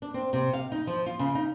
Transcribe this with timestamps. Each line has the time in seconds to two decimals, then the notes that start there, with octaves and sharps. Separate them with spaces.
0.02 D4
0.14 C4
0.33 C3
0.53 F5
0.72 D#4
0.87 F3
1.06 F4
1.19 C#3
1.35 D#4